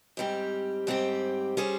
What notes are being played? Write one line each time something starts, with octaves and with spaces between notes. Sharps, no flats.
G#2 G3 C4 G4
G#2 G3 C4 G4
G3 C#4 G#4 C5